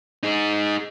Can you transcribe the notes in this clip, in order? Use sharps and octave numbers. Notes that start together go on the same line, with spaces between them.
D#4 G#4